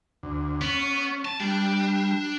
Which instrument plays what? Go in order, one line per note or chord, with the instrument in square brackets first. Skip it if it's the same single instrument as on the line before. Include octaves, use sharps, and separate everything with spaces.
[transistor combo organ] D2
[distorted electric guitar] B3 [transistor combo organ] C#4
[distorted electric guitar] A5
[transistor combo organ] G3 [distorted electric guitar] D4